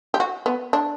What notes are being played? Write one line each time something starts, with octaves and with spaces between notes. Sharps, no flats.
G4
F#4
B3
D4